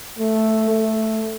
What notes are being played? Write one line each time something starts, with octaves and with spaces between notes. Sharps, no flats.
A3
A3